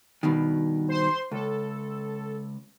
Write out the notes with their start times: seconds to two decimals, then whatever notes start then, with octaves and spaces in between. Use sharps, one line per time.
0.23 G2 B2 D#3
0.89 C5 C6
1.31 C#2 A4